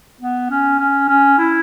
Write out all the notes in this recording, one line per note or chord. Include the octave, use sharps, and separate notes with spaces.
B3
C#4
C#4
C#4
E4